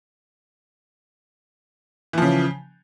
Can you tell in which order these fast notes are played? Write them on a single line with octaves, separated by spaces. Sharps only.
E3 F3 C#3